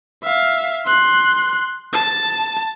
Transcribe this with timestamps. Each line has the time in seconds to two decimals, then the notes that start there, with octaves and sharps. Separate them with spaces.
0.23 E5 F5
0.86 C6 F#6
1.93 A5